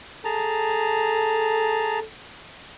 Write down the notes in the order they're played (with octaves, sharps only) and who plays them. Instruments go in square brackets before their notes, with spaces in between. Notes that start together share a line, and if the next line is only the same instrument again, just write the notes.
[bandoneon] G#4 A5 A#5 [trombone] A4